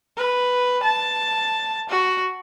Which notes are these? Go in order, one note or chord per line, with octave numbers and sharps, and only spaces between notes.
B4
A5
F#4